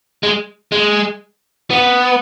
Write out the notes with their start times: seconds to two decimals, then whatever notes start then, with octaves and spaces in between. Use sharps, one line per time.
0.23 G#3
0.72 G#3
1.70 B3